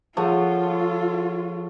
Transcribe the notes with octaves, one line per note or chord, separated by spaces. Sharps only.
F3 F4 G#4 A4 C#5 F#5